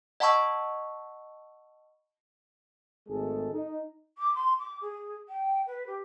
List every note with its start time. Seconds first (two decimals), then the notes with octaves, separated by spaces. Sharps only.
0.20 D#5 F#5 A5 B5 C#6 E6
3.09 G#1 G#3 A3 G#4 A4
3.52 D#4
4.18 D6
4.35 C6
4.59 D6
4.81 G#4
5.28 G5
5.66 B4
5.86 G4